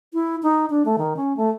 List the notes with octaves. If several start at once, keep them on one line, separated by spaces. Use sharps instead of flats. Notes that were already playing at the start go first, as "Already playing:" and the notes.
E4
D#4
D4
A3
D#3
C#4
A3